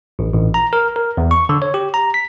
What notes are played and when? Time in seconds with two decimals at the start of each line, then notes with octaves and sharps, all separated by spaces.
0.19 A1
0.34 A1
0.54 A#5
0.73 A#4
0.96 A#4
1.17 E2
1.31 C#6
1.49 D3
1.62 C#5
1.74 G4
1.94 A#5
2.14 B6